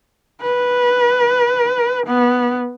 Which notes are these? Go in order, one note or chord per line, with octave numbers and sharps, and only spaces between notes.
B4
B3